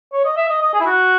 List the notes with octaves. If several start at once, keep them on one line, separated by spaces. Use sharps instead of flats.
C#5
D#5
E5
D#5
D#5
G#4
E4
F#4